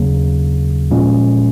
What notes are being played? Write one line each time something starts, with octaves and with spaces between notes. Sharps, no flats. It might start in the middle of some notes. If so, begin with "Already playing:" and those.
Already playing: D#2 C#3 F#3 A#3
A#2 F3 G#3 C#4